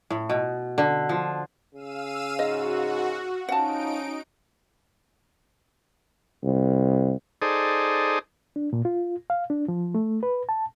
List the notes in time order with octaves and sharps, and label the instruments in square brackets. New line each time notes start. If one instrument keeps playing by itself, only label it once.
[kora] A2
B2
D3
F3
[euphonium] C#3 [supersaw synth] F5 E6 D#7
[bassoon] G#2 [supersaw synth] F#4 [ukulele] D#5
[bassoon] F3 [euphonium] C#4 [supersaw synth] D#4 D7 [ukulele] F#5 A5
[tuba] C2
[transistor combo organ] D#4 G#4 A4 C5 D5 D#6
[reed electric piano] D4
A#2
F4
F5
D4
F3
A3
B4
A5